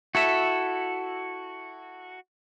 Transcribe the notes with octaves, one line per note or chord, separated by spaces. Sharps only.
E4 F#4 A4 E5